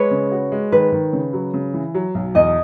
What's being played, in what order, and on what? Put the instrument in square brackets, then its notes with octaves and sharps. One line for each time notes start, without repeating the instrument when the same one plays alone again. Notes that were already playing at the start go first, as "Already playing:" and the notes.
Already playing: [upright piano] G#3 [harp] B4 C#5
[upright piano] C#3
F#4
G#3
[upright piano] D#3 [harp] B4
[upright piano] D#3
C#3
F#3
C#3
E3
F#3
B1
[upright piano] E2 [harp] D#5